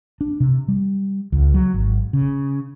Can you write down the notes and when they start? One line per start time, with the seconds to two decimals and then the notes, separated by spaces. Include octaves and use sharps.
0.21 D4
0.40 C3
0.68 G3
1.32 C#2
1.54 F#3
1.74 G#1
2.13 C#3